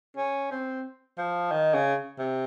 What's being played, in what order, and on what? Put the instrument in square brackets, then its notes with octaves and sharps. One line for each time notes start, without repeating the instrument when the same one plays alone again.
[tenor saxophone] C#4
C4
F3
D#3
C#3
C3